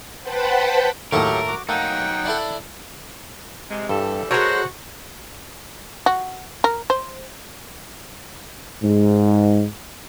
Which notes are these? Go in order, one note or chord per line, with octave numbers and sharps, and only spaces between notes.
B4 C5 F#5 G5 A5 B5
D#2 A2 F#3 A3 G4 A4 A#4 C#6
F#4 D6
F#3 A3 A#3 D#4 F#5 G5
D4 E4 A4
C3 G#3
G2 E3 G3 A4
G#3 F#4 A4 A#4 C5 C#5
F#4
A#4
C5
G#2